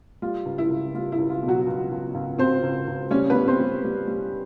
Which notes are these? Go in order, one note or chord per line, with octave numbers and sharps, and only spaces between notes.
G3 F4
C#2
E4
C#2
G3 F4
E4
C#2
F4
B2
F#3 F#4
C#2
C#2
C#2
C#2 C4 C5
C#2
C#2
G3 C#4 C#5
B3 B4
G3
C4 C5
G3
G3
G3